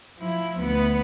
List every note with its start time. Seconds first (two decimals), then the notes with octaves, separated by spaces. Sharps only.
0.19 F3 E4
0.60 D2 B3